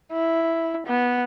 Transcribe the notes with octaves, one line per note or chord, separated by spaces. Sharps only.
E4
B3